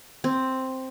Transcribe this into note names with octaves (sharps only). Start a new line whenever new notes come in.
C4